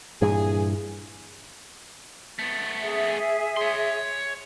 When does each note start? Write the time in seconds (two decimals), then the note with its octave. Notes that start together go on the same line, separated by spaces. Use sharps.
0.22 G2 A#2 E3 G#4
2.39 A3 B3
2.82 G#4 E5
3.57 C#5 C6